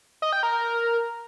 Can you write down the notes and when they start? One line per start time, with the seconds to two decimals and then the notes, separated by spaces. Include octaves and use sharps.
0.22 D#5
0.33 G5
0.43 A#4